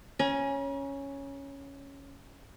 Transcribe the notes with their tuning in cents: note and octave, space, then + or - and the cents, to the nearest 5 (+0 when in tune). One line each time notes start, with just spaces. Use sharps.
C#4 +0 A#5 +45